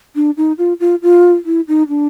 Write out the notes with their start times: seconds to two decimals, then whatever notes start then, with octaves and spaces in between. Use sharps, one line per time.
0.16 D4
0.37 D#4
0.58 F4
0.80 F4
1.02 F4
1.46 E4
1.68 D#4
1.89 D4